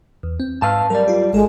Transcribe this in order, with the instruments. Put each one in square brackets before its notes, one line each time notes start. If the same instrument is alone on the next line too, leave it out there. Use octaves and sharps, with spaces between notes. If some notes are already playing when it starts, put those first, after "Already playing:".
[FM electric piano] E2
C4
[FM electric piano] G#2 E6 F6 [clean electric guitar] B4 F5 A5
[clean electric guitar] F#3 G3 D5 [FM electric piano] A#4
[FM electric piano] F4 G4
[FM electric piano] G#1 A4 [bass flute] G#3